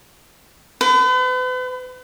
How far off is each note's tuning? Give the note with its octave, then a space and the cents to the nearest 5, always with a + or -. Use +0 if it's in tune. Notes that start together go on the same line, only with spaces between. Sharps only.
B4 +40